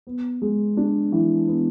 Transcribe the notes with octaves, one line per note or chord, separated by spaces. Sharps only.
B3
G#3
D4
E3
B3